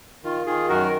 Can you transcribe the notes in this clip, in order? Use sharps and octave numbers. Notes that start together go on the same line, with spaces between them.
D#3 F4
D#3 F4 G#4
F#2 F#4 A#4